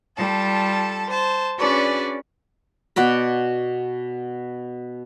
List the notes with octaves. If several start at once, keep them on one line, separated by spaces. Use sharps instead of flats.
G3 F4 A4 A5
C5 A5
C#4 D4 F#4 G#4 B4 D5
B2 F#4 D5 B5